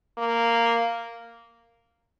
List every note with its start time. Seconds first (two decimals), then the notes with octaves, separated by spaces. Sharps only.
0.18 A#3